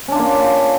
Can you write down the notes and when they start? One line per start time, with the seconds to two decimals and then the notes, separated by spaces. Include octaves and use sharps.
0.08 C#4
0.12 D4
0.15 F4
0.19 A#3